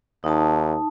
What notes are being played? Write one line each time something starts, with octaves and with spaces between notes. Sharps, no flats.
D#2 D#4 A5